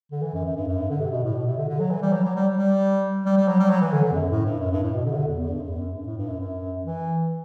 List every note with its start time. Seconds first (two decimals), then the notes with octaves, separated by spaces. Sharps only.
0.11 D3
0.22 E3
0.34 F#2
0.45 F#2
0.56 G2
0.68 F#2
0.78 G2
0.90 D3
1.01 C3
1.12 B2
1.24 A2
1.34 B2
1.46 C3
1.57 D3
1.68 D3
1.80 F#3
1.90 E3
2.02 G3
2.13 F#3
2.24 F#3
2.36 G3
2.57 G3
3.25 G3
3.37 G3
3.48 F#3
3.59 G3
3.70 F#3
3.82 E3
3.93 D3
4.04 D3
4.12 E2
4.15 F#2
4.31 A2
4.46 G2
4.60 F#2
4.72 G2
4.83 A2
4.94 B2
5.05 D3
5.12 C3
5.16 D3
5.28 E2
5.39 E2
5.50 G2
5.59 F#2
5.67 E2
5.76 F#2
5.95 G2
6.06 A2
6.18 G2
6.28 F#2
6.40 F#2
6.85 E3